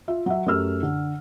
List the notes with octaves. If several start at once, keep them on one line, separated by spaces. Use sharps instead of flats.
F4 E5
F#3 E5
F#2 A3 G4 A#4 E6 F6
D3